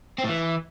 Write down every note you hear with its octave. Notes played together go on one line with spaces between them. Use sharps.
C4
A2
E3